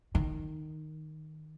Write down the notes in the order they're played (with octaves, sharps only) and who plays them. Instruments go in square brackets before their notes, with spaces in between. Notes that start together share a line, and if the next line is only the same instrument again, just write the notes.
[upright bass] D#3